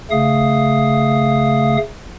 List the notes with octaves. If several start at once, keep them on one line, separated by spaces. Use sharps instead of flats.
C#3 A3 F5 D#6